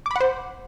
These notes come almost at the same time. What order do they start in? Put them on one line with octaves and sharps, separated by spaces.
D6 B5 F#5 C5